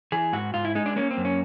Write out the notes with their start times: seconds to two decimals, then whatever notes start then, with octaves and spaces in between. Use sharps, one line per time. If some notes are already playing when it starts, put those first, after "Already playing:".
0.12 E3 G#4
0.33 G#2 F#4
0.54 G#2 F4
0.65 E4
0.75 G#3 D#4
0.86 D4
0.96 A#3 C#4
1.11 C4
1.17 F#2
1.25 C#4